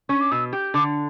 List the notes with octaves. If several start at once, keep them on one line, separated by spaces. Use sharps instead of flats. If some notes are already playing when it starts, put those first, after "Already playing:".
C#4 C#6
D6
B2 E6
G4
D3 D6